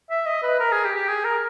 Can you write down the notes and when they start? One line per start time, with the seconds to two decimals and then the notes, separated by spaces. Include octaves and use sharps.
0.10 E5
0.27 D#5
0.43 B4
0.60 A#4
0.72 G#4
0.84 G4
0.95 G4
1.08 G#4
1.24 A#4